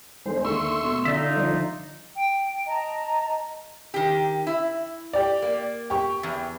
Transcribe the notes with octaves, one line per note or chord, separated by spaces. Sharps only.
E2 D3 G#3 C5
D#2 D3 A3 C6 C#6 E6
B2
D3 C#4 D#4 F4 E5
F3 D5
G5
D#5 A5 A#5
D#3 G4
E4
G4 D5
A#3
G4 C#6
E2